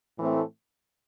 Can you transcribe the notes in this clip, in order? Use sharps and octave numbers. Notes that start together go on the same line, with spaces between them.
A2 E3 A3 C4